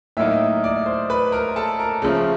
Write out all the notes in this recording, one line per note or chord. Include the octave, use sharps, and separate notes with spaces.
A2 F#3 A#3 D#4 E5 E6
D5 D6
C5 C6
B4 B5
A#4 A#5
A4 A5
A#4 A#5
C#3 F3 A3